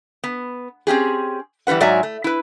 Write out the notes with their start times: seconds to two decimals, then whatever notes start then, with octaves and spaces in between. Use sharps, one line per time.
0.24 B3
0.87 C4 C#4 G4 G#4
1.67 E3 G3 F4 B4 F#5
1.80 G#2 F#3 D5 E5 G#5 A#5
2.03 A3
2.24 E4 B4